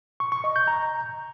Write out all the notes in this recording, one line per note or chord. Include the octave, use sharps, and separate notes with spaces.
C#6
C#6
D#5
G6
A#5